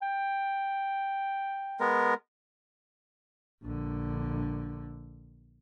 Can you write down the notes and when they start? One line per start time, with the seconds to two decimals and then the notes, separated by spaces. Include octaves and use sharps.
0.02 G5
1.80 G#3 B3 A#4
3.63 A#1 D3